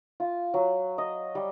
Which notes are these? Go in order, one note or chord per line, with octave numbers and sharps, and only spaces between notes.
F4
F#3
D#5
G3